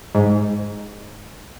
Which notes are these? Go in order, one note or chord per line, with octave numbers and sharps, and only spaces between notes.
G#2